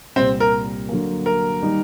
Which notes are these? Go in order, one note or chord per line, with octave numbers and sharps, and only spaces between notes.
C2 A#2 G3 C4
A#4
D3 F#3 A#3
A#4
D#3 G3 A#3 D#4